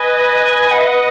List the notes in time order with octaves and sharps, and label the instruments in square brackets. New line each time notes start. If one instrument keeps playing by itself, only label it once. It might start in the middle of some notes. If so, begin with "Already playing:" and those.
Already playing: [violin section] B4 D#5 [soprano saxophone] G#5
[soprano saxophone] F#5
E5
F#5